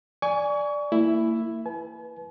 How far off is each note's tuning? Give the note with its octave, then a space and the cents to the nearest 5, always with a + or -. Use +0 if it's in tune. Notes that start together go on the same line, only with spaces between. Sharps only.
D5 +0 G#5 +0 C#6 +35
A#3 -30 E4 +5
B4 -5 G#5 +45